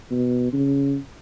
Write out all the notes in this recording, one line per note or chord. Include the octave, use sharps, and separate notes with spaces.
B2
C#3